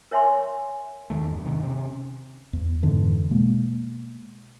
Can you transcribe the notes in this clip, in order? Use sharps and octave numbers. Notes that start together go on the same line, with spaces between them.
A#4 C#5 E5 G#5 C6 C#6
E2 D#3 A3
G2
C3 D#3
C3 C#4
E2
F2 G#2 D3 E3
B2 G#3 A#3